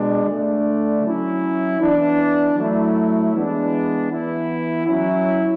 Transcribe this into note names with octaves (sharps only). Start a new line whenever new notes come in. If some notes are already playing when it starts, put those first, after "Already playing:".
Already playing: B2 G#3 D4
D3 A3 D4
F#3 C#4 E4
E3 B3 D4
F#3 A3 E4
E3 G#3 B3 D4
E3 B3 E4
F#3 C#4 E4